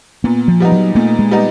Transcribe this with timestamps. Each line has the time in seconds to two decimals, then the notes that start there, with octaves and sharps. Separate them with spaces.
0.24 A#2 B3
0.48 F3
0.60 G3 B3 D#4
0.72 F#3
0.95 A#2 A3
1.19 G#3
1.31 G3 B3 D#4